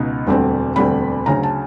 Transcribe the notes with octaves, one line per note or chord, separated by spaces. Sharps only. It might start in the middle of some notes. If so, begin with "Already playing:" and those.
Already playing: C#2 B2 B3 D#4
E1 D2 D3 G3 C4
E1 D2 D3 G3 C4 B5
D2 C#3 F#3 A#5
A5